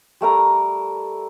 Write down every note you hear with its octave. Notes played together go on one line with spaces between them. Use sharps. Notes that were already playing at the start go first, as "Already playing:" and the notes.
G3 A3 A#4 A#5